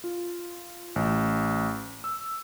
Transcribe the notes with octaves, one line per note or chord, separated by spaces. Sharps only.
F4
A1
E6